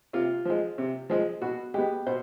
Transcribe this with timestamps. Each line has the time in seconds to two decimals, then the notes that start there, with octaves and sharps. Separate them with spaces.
0.13 C3 F4
0.45 F3 G#3
0.78 C3
1.10 F3 G#3
1.42 B2 F#4
1.74 G#3 B3 G4
2.07 B2 C5